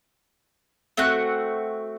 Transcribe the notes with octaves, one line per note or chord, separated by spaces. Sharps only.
A3 C4 F#4 F#6